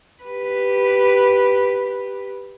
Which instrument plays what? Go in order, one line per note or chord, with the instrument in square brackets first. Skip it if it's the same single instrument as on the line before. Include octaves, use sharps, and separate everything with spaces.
[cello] G4 B4